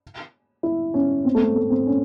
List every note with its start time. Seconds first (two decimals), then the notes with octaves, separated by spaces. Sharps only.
0.63 E4
0.94 C#4
1.25 C4
1.35 A3
1.40 C4
1.55 A3
1.70 C4
1.86 C#4